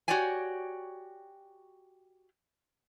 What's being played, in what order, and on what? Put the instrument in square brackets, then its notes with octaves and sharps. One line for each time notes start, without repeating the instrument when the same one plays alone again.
[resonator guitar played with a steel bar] F#4 G4 C#5 D5 G5 G#5